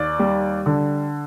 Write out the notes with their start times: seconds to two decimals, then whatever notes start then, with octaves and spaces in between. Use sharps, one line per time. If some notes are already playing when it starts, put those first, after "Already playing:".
Already playing: D#2 D5
0.19 G3
0.66 D3